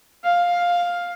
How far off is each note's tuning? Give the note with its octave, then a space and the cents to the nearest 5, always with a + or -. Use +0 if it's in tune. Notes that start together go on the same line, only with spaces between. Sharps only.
F5 +10